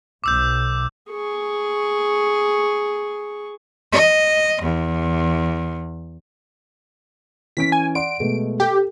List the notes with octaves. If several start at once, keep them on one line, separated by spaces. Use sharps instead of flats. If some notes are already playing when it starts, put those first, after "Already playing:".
B1 D6 E6 G6
G#4 C#6
D#5
E2
E3 C#4 B6 D7
G#5
D5 F#5 C6 D7
B2 G#3 A3
G4 A4